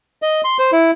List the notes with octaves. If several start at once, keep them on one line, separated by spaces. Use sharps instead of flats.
D#5
C6
C5
E4